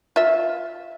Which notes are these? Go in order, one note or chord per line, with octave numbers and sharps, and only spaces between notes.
F4 E5